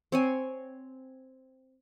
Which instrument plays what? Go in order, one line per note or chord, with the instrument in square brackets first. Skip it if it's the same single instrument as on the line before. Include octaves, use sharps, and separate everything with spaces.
[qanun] C4 C#5 G#5